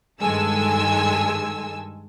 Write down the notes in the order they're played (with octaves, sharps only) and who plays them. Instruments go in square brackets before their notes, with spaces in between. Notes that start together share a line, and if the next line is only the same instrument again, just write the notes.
[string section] G2 D#3 G#3 A4 G#5 E6